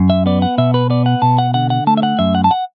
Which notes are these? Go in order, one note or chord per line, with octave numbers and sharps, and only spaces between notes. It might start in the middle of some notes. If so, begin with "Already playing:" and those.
Already playing: F#2
E5
B3 D5
F#5
B2 E5
B4
B3 D5
F#5
B2 A5
F#5
D3 F#5
F#5
A3 A5
E5
F#5
F#2 E5
F#5
A5
F#5